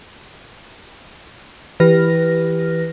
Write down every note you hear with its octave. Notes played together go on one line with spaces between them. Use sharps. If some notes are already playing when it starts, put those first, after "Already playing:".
E3 G4 B4 F6 A#6